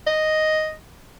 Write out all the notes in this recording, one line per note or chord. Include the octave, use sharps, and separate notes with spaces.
D#5